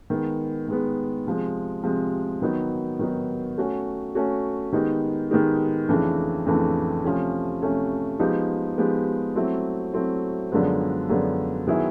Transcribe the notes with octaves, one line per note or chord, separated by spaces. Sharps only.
D#3 G#3 B3
D#3 G#3 B3
C3 F3 G#3
C3 F3 G#3
D#3 F#3 B3 D#4
D#3 F#3 B3 D#4
A3 C#4 F#4
A3 C#4 F#4
D#3 G#3 B3 D#4 G4
D#3 G#3 B3 D#4 G4
F2 C#3 E3 A3 D4
F2 C#3 E3 A3 D4
C3 F3 A3 C#4
C3 F3 A3 C#4
F3 G#3 B3 D#4 G4
F3 G#3 B3 D#4 G4
F#3 A3 C4 E4
F#3 A3 C4 E4
F#2 D3 F3 G#3 B3
F#2 D3 F3 G#3 B3
D#3 F#3 B3 E4 G#4